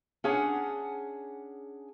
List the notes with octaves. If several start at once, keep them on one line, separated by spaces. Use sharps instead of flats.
C#4 D4 G#4 F#5